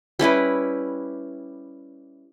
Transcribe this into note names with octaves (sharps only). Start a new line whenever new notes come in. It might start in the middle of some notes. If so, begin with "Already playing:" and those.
G3 C#4 E4 B4